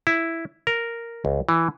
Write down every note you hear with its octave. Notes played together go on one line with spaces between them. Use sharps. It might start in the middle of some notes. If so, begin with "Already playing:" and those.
E4
A#4
C#2
E3